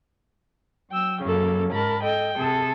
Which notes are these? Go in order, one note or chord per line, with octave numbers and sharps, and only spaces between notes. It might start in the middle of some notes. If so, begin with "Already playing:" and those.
F#3 G5 E6
F#2 C#3 F#3 A#3 A4
G#2 A#4 A5 B5
A4 D#5 G5
C3 G#4 A4